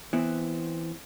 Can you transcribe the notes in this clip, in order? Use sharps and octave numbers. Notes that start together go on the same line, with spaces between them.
E3 B3 C4